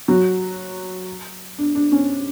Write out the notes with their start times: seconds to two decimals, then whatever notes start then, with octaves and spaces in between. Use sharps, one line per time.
0.08 F#3 F#4
1.58 D4
1.75 D4
1.92 C#4